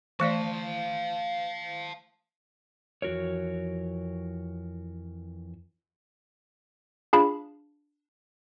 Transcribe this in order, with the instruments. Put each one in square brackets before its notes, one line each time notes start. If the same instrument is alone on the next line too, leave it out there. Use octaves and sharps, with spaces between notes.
[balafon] E3 A3 D5 [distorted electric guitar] F5 A5
[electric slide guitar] F2 E3 F#4 A#4 C#5
[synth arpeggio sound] D4 F4 G#4 F5 A5 B5